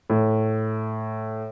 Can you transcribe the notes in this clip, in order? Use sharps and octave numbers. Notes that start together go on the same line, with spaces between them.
A2